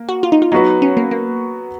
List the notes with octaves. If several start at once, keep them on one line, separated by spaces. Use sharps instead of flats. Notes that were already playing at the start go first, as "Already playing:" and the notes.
Already playing: A#3
F#4
F4
D#4
F4
F#3 B3 D#4 F#4 B4
C#4
A#3
A#3